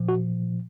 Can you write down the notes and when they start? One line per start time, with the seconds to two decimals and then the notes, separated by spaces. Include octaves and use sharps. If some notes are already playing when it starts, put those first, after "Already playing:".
Already playing: A#2 F3
0.09 F#4